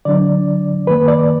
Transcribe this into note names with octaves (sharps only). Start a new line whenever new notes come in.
D3 F#3 D4 D5
F#2 D#3 A#3 B4
D5